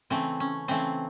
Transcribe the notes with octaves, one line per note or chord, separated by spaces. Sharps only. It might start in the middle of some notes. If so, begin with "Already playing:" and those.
C#3 E3 A3 C4
C#4
C#3 E3 A3 C4